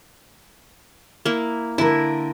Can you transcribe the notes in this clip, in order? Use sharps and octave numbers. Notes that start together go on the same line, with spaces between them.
A#3 E4
D3 E4 A#4